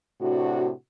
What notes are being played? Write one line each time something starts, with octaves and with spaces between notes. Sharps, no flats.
A2 C3 D4 F#4